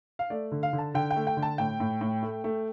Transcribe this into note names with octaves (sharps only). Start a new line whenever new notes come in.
F5
A3 D5
D3
F5
D3
A5
D3 G5
G5
A3
G5
D3
A5
A2 G5
A2
A2
A3
A3